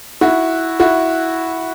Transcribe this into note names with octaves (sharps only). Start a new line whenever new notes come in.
E4 F#4
E4 F#4